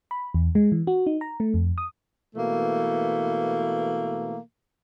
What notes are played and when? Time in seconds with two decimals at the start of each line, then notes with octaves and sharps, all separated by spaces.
0.11 B5
0.34 E2
0.55 G#3
0.72 E3
0.87 F#4
1.07 D#4
1.21 A#5
1.40 A3
1.54 F2
1.78 D#6
2.35 B2 E3 A3 A#3